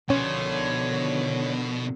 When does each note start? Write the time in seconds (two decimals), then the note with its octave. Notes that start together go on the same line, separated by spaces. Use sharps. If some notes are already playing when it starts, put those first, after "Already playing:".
0.10 B2 D3 D#3 F3 C#4 C#5 C6